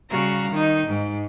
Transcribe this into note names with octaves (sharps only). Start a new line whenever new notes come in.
C#3 G3 F#4 F5 A#5
D#3 D#4
G#2